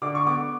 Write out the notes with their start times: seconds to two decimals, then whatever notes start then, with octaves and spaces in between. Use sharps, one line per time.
0.02 D3 D6
0.15 C#6
0.26 B3 D6